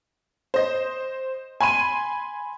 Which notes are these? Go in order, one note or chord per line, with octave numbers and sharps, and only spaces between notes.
C5 D#5
G#5 B5 C6 D#7